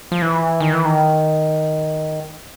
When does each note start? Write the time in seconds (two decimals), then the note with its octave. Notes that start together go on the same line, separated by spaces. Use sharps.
0.12 F3
0.22 E3
0.60 D#3
0.73 E3
0.85 D#3